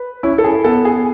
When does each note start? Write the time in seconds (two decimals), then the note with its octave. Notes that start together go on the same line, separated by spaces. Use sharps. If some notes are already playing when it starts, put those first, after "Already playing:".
Already playing: B4
0.23 C#4 E4
0.38 A4
0.44 G#4
0.64 B3 A4
0.85 G#4